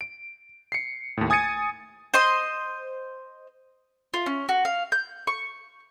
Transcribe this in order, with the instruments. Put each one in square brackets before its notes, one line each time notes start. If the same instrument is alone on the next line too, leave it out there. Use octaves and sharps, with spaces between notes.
[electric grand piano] D7
C7 C#7
D#2 A2
G#5 D#6 G#6 A6 C#7 D#7
[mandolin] C5 D#5 C6
F4
C#4
F#4
F5
G6
C#6